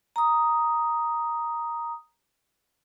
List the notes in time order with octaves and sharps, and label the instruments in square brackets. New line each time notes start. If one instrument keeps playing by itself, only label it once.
[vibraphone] A#5 D#6